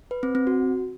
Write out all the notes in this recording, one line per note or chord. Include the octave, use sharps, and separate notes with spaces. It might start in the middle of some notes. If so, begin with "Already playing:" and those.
B4
C4
C4
F#4